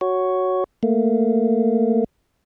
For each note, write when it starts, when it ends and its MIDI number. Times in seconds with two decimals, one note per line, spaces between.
0.01 0.64 66
0.01 0.64 73
0.83 2.04 57
0.83 2.04 58